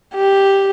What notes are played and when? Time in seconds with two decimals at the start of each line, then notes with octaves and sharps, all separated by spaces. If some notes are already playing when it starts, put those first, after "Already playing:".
0.15 G4